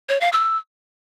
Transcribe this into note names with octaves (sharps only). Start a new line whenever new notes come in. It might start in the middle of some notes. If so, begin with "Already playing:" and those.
C#5
F5
E6